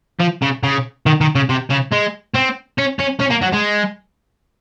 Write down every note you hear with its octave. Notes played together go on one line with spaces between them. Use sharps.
F3
C#3
C#3
D#3
D#3
C#3
C3
C#3
G#3
C4
C#4
C#4
C#4
A#3
F#3
G#3